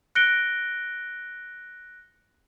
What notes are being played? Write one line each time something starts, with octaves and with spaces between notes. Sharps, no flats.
F#6 A#6 C#7 D7 G7